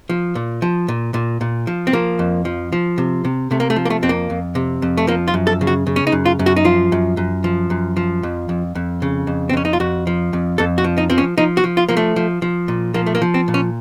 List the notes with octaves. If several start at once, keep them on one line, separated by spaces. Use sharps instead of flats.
F3
A#2
F3
A#2
A#2
A#2
F3
C4
F3 A#3
F2
F3
F3
C3
C3
C3 A3
A#3
A3
F3
A#3
A3
F2 C4
A#3
F2
C3
F2
A3
F3 A#3
F4
F#2
A4
C#3
F#4
C#3
C#4
D#4
F#2
F4
F#2
F#4
D#4
F3 F4
F#2
F#2
F3
F#2
F3
F2
F2
F2
C#3
F2
C4
F2 C#4
D#4
F4
F2 F#4
F3
F2
F2 A4
F#4
F3
D#4
F3 C4
C#4
F3 D#4
F#4
F3
F4
F3 A#3
A3
F3
F3
A#2
F3 A#3
A3
A#3
F3
C4
A#2
C#4